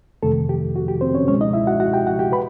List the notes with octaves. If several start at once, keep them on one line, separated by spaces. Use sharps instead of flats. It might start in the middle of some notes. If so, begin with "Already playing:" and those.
F2 C3 D#3 A3 A4
G4
F#4
G4
C4 C5
C#4 C#5
C#2 B2 G#3 C#4 C#5
D#4 D#5
E4 E5
F#4 F#5
F#4 F#5
G4 G5
F#4 F#5
G4 G5
B4 B5